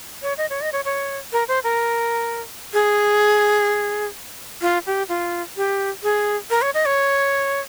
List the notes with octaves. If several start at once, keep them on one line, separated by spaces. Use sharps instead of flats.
C#5
D#5
C#5
D#5
C#5
C#5
A#4
C5
A#4
G#4
F4
G4
F4
G4
G#4
A#4
C#5
D#5
C#5